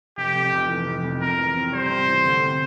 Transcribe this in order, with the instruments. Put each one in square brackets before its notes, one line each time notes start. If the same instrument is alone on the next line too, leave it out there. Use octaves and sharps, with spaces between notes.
[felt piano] F1 [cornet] G4
[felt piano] F2
F1
E3
F1
F2
[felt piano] C3 [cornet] A#4
[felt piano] E3
C4
[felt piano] G3 [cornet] C5
[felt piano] C3
E3
D2
C3